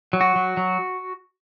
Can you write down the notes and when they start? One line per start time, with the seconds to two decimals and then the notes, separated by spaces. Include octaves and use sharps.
0.13 F#3
0.21 F#4
0.36 F#3
0.57 F#3